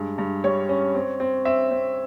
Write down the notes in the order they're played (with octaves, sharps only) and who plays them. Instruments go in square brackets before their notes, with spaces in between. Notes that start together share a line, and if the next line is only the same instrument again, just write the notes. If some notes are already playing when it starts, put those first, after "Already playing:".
Already playing: [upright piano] G2 G#3
G2
G3 C#5
C#4
C4
C4
C4 E5
C4